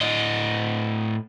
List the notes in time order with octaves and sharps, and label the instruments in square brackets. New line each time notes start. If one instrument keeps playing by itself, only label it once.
[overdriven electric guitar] A2 D#5